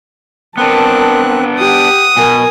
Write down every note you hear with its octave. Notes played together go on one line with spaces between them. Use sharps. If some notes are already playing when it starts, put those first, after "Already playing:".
B3 C4 D4 A#4 A5 F#6
G4 F#5 D#6
B2 A#4 G#5